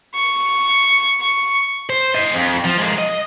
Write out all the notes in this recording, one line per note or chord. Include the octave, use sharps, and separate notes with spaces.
C#6
C#6
C5
C5 D#5
F2
F3
G#3 A#3
D#5